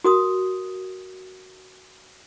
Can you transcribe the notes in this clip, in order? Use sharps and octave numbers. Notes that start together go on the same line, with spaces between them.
F#4 A#4 D#6